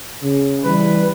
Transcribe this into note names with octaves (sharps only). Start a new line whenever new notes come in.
C#3
E3 G3 B4